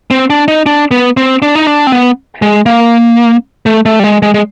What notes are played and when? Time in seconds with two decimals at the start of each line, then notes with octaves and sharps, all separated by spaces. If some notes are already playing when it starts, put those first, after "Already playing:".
0.11 C4
0.30 D4
0.48 D#4
0.66 D4
0.91 B3
1.17 C4
1.42 D4
1.55 D#4
1.67 D4
1.87 C4
1.92 B3
2.42 G#3
2.66 A#3
3.66 A3
3.86 A3
3.99 G3
4.04 G#3
4.22 G#3
4.34 G#3